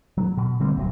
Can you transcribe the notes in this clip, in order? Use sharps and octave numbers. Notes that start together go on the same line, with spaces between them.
F#3
B2
D3 G3 A#3 C4
D#1 C2 D3 F#3